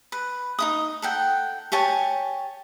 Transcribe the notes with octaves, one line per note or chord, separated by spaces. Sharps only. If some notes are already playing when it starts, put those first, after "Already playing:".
B4
D#4 E4 D#6
A4 F#5 G5
G4 C#5 G#5 A5